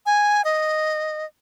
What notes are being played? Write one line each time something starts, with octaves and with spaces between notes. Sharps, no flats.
G#5
D#5